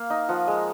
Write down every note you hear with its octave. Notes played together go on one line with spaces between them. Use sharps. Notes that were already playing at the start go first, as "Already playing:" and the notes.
Already playing: A#3 F5
D#4
F3 F#5
G#3